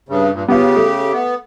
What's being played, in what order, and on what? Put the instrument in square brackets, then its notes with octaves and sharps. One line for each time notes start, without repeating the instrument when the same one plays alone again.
[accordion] G2 C#3
G2 A#2
[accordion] C#3 G4 [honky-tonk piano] B3 F4
[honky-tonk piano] A3
[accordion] B3